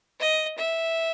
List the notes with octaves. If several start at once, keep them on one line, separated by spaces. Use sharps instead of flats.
D#5
E5